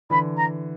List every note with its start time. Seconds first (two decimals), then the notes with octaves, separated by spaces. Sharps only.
0.10 D3 E3 B5
0.36 A#5